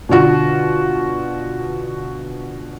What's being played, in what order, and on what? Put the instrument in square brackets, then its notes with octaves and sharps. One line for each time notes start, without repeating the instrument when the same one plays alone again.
[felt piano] B2 D3 F4 F#4